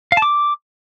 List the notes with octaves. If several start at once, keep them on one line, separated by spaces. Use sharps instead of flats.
F5
A5
D6